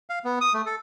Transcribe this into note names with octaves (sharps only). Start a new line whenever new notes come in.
F5
B3
D#6
A3
A4